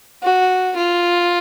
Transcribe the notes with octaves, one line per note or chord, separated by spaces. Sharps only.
F#4
F4